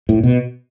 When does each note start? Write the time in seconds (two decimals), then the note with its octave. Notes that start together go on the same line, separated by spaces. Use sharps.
0.09 A2
0.23 B2